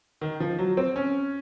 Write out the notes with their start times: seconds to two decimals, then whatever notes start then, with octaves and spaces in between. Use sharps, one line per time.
0.21 D#3
0.40 F3
0.59 F#3
0.77 C4
0.96 C#4